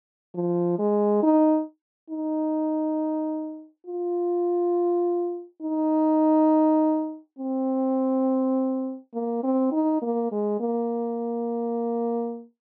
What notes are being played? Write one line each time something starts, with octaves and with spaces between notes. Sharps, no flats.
F3
G#3
D#4
D#4
F4
D#4
C4
A#3
C4
D#4
A#3
G#3
A#3